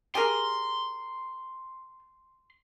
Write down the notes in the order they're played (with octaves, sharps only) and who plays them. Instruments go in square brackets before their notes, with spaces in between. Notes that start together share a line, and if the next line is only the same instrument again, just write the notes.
[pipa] G4 G#4 A#4 [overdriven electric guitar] C6